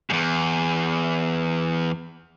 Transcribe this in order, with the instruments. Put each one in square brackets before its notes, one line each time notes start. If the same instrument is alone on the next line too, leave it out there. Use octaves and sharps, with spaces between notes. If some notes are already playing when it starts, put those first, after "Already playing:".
[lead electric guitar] E2 G#2